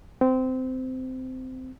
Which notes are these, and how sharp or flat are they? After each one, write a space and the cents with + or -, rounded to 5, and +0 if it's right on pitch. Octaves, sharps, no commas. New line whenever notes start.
C4 -20